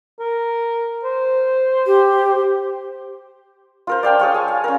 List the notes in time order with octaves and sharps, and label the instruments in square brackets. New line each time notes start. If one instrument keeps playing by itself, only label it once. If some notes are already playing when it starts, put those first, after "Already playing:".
[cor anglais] A#4
C5
[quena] G4
[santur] F4 A#4 C5
D5 F5 G5 A5
G#4 C#5 F5
G#5 A5
F5
C#4 A#4